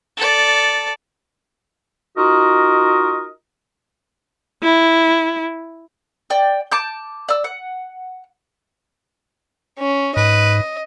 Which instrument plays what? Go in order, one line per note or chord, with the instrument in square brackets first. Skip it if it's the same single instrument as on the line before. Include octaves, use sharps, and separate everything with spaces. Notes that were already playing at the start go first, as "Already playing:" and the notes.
[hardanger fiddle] A4 D5
[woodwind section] D#4 F4 F#4 A#4 D#5
[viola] E4
[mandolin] D5 G5
A5 D6 G6
D5 E6
F#5
[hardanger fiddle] C#4
[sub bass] G#2 [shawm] B4 [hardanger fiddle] D#5